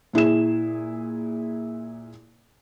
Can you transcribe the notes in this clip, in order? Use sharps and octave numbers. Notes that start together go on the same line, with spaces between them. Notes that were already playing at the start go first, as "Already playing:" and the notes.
A#2 E4 G#4 E7